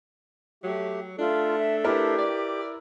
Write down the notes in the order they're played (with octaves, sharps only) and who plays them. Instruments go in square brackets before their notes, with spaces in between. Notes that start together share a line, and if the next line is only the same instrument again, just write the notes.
[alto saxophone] F#3 [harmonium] A3 G4
[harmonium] A3 A4 [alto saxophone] D4 [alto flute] F4
[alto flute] E5
[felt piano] E4 A#4 B4 [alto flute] G4
[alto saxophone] D5